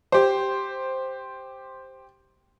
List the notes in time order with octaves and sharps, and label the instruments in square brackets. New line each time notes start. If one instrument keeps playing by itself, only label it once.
[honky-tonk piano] G4 C5